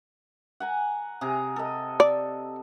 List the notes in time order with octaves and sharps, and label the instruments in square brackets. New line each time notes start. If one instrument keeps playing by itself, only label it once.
[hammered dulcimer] F#5 G#5 A#5
C3 G#4 A#5
A4 D#5
[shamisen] D5